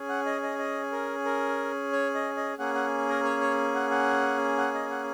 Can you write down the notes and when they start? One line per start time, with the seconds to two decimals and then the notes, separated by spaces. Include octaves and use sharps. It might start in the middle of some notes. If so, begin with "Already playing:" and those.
Already playing: C#4 G#4
0.09 F#5
0.26 D#5
0.43 D#5
0.59 D#5
0.92 A#4
1.25 A#4
1.93 C#5
2.15 D#5
2.37 D#5
2.58 A#3 C#4 G#4 F#5
2.75 F#5
3.09 A#4
3.25 C#5
3.41 C#5
3.75 F#5
3.91 F#5
4.58 F#5
4.74 D#5
4.91 F#5